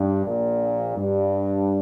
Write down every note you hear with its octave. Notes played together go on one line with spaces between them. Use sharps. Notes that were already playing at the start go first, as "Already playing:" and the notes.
Already playing: G2
A#1 A#2
G2